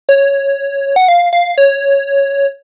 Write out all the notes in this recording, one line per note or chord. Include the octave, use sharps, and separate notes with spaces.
C#5
F#5
F5
F5
C#5